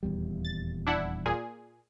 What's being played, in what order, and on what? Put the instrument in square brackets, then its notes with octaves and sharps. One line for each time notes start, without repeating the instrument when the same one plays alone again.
[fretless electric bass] D#1 E2 G3
[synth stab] A6
D4 E4 F#5
A#2 G#4